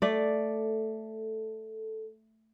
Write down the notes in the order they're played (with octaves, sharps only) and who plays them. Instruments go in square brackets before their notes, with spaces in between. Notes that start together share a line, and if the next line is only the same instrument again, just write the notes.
[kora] A3 D5 [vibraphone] A4